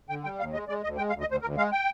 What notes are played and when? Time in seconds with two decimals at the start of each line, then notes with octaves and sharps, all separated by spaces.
0.09 D3 G5
0.24 G3 G5
0.39 D#2 F5
0.53 G#3 D#5
0.68 G#3 D5
0.84 D2 D#5
0.97 G#3 G5
1.09 F5
1.13 D2
1.21 D#5
1.27 D2 C5
1.42 D2 A#4
1.57 G#3 F5
1.72 G5